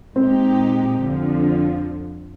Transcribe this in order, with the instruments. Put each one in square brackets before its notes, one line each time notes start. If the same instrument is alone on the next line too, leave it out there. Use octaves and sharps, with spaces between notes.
[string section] A#2 G#3 D#4 G4 [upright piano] C4
[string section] F2 D3 F3